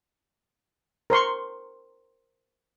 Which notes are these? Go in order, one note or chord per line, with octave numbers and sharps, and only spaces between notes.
A#4 C5 C6 C#6